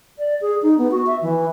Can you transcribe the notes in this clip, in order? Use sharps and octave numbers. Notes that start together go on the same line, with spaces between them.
D5
G#4
D#4
B3
F#4
E5
E3